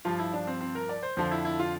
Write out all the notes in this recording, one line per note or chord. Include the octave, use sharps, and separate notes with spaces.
G2 F3 F4
E4
D4
C4
C4
A#4
D5
C5
F2 D3 F3 C5
E4
E4
F4